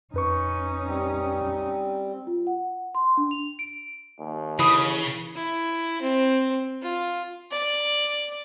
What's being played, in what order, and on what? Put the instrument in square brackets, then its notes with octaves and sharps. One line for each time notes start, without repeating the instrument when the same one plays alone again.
[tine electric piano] F2 B4 C#6 [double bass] C#4 D#4
[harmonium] G3 C4
[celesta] F4
F#5
C6
D4
F7
D7
[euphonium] D#2
[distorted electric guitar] C#3 [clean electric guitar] E3 [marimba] B5 D#6
[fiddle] E4
C4
F4
[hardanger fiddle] D5